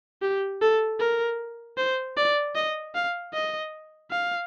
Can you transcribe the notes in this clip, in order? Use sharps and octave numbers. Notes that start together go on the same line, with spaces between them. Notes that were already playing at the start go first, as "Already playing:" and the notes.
G4
A4
A#4
C5
D5
D#5
F5
D#5
F5